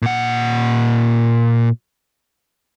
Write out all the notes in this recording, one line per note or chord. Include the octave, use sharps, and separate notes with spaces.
A#2 F#5